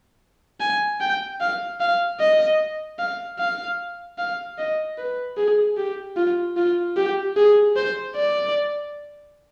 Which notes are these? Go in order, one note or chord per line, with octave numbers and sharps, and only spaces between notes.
G#5
G5
F5
F5
D#5
F5
F5
F5
D#5
B4
G#4
G4
F4
F4
G4
G#4
C5
D5